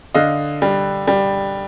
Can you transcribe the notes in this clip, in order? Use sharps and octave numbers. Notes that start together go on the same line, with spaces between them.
D3 D#5 F5
G3
G3